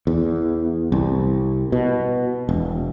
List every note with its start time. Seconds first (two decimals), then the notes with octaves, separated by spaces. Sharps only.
0.07 E2
0.92 C2
1.72 B2
2.49 E1